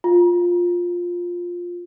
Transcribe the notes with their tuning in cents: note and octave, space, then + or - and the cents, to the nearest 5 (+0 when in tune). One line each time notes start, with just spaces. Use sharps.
F4 +10